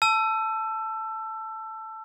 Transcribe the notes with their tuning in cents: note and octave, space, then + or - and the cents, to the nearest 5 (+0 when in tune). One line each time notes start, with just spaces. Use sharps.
A5 +0 E6 +25